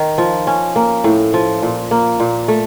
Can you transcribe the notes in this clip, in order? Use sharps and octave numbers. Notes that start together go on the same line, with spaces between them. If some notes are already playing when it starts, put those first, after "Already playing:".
Already playing: D#3
F3
C#4
A#3
A2
F3
A#2
A#3
A#2
A3